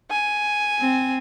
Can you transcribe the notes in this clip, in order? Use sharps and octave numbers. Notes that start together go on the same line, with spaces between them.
G#5
C4